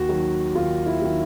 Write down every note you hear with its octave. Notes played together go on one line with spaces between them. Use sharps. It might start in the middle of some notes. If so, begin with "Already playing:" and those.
Already playing: D#2 F#4
D#3 F#3
D#2 F4
E4
D#3 F#3